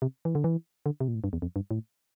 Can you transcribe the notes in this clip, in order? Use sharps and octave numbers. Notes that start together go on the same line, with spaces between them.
C3
E3
D3
E3
D3
C3
A#2
A2
G2
E2
F2
G2
A2